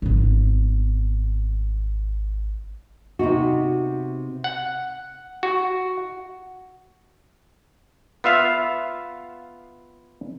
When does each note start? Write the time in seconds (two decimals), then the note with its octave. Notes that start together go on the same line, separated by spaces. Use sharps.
0.02 G#1 B3
3.19 C3 B3 D#4 F#4
4.44 F#5
5.43 F#4
8.24 B3 F4 E5 F5